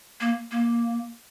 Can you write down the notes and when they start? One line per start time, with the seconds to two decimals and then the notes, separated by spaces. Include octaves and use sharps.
0.21 A#3
0.52 A#3